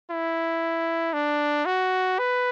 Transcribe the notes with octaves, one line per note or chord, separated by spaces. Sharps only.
E4
D4
F#4
B4